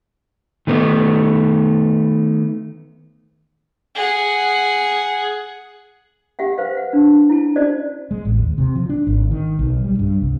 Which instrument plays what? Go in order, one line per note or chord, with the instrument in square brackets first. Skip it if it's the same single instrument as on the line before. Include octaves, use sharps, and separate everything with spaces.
[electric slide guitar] D#3 A3 B3
[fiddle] G#4 F#5
[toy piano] G4 E5 F#5 G5
B4 C5 F5
F#5
D4
E4 A5
C#4 F#4 C5 D5 D#5
[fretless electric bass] G#3
A1
D#2
C3
F3
D4
G#1
D#3
B1
G3
G2
C2